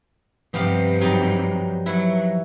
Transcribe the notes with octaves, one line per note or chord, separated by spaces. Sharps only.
G2 C3 F3 B3 G4 F5
F#3 G3 D#4
F#3 E4 B4 B5